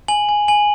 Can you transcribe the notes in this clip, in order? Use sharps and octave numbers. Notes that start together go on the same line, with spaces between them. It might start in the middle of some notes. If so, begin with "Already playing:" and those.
G#5 F#7
G#5
G#5 F#7